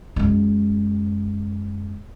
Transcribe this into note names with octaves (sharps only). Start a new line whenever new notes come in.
F#2 G#3